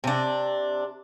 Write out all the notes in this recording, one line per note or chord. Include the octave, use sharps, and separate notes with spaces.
C3 D4